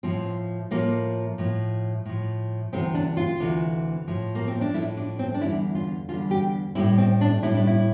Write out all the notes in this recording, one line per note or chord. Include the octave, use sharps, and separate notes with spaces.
A2 F3 C4
A2 F3 A#3
A2 F3
A2 F3
D2 C3 E3 C4
D4
F4
D2 C3 E3
A2 F3
A#3
C4
D4
A2 F3 E4
D4
C4
D4
E2 D3 G3 E4
F4
E2 D3 G3 F4
G4
A2 G3 E4
C4
D4
A2 G3 E4
D4
E4